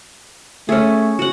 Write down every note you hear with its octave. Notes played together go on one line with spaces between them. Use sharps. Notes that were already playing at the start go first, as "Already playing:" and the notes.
A3 C#4 G#4
F#4 F#5